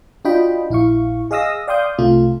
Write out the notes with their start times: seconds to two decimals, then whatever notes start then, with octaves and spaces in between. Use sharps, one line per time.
0.25 D4 F4 F#4 D#5 G5 B5
0.70 A#1 E4 F5 C#6
1.31 G#4 D#5 F5 D#6 E6 A#6
1.68 D5 F5 G5 C6 D#6 G6
1.98 C2 C3 A3 F4